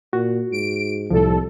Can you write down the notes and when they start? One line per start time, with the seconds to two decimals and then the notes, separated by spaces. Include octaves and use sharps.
0.13 A#2 F#4
0.52 G#2 D7
1.10 C2 A2 F3 A4